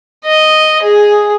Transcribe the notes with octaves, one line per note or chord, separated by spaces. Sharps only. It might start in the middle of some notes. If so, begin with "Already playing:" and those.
D#5
G#4